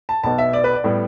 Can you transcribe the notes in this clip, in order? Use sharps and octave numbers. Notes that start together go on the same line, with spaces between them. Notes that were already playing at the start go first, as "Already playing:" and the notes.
A5
B1 B2 B3 A5
E5
D5
B4
D5
A2 G3 B3